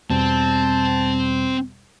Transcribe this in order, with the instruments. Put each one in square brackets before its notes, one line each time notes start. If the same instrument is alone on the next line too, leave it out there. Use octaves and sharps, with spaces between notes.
[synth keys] E2 B2 G3 [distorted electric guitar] C4 [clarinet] A5